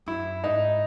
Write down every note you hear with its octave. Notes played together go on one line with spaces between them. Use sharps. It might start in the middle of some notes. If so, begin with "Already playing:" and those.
F#2 E4
G#2 D#4